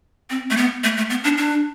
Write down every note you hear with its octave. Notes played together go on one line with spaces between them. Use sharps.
C4
A3
B3
A3
A3
B3
D4
D4